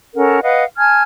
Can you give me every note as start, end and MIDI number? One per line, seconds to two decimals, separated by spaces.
0.15 0.39 61
0.15 0.39 69
0.15 0.39 70
0.15 0.39 78
0.42 0.63 71
0.42 0.63 75
0.42 0.63 77
0.42 0.63 78
0.77 1.02 80
0.77 1.02 81
0.77 1.02 89
0.77 1.02 92